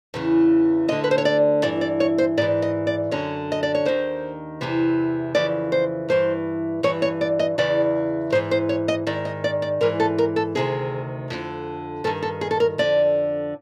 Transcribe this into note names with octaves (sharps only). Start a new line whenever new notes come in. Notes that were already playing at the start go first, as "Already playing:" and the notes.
E2 C#3 E3
D2 D3 D#5
B4
C5
C#5
D5
G2 E3 D5
D5
C#5
C5
G#2 E3 D5
D#5
D5
F#2 D3 C#5
D#5
D5
C#5
D#2 D#3 C5
E2 C3 E3
F2 C#3 E3 D5
C5
G2 E3 C5
G2 E3 C#5
C#5
D5
D#5
E2 C#3 E3 D5
G#2 E3 C5
C5
C#5
D#5
G#2 D#3 D5
D#5
D5
D5
G#2 E3 A#4
A4
A#4
A4
D2 C3 D#3 G#4
F2 D3
G2 D#3 A4
A4
G#4
A4
A#4
F2 D3 D5